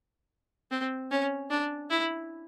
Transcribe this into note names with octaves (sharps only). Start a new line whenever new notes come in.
C4
C#4
D4
E4